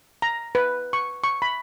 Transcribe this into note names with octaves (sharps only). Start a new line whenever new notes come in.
A#5
B4
C#6
C#6
B5